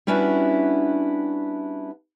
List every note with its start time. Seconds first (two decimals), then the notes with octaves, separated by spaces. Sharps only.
0.07 G3 B3 C#4 D4 E4 F#4